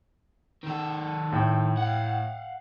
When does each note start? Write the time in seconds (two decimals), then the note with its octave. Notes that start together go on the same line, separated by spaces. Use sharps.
0.63 D#3 A4
1.32 A2 G5
1.77 F5 F#5